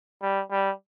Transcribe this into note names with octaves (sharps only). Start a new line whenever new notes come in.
G3
G3